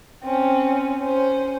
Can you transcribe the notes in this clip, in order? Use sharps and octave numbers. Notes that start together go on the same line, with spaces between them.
C4 C#4
C#4 C5